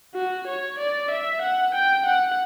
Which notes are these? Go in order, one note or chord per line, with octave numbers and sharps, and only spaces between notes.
F#4
C#5
D5
E5
F#5
G5
F#5